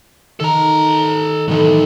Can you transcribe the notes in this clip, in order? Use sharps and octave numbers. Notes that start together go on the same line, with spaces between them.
D#3 A4 A#5
A2 D#3 E3 F#3 D#4